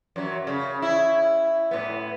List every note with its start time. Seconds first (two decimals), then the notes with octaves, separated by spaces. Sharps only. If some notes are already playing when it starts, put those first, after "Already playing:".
0.16 F#2 F#3
0.47 C#3
0.82 E4
1.71 A2 B3